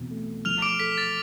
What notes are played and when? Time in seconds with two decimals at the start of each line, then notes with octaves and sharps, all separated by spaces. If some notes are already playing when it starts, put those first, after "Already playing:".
Already playing: E2 B2 C4
0.10 A3
0.45 F3 F6 F7
0.62 D6 D7
0.79 A4 B6
0.98 A6